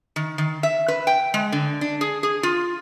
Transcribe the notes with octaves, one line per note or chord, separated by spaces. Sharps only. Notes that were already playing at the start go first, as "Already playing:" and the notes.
D#3
D#3
E5
B4
G5
G#3
D3
D4
G#4
G#4
F4